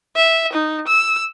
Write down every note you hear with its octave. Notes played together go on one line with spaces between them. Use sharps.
E5
D#4
E6